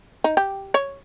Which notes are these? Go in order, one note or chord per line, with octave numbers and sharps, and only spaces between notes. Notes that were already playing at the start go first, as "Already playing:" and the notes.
D#4
G4
C#5